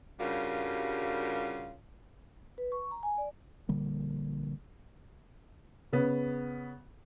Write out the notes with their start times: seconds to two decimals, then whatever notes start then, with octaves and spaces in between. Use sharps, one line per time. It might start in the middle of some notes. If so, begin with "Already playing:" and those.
0.19 G2 C#3 G3 F4 F#4 A#4
2.58 B4
2.72 C#6
2.91 A#5
3.03 G#5
3.18 D5
3.69 A#1 D3 G3 A#3
5.93 C#3 B3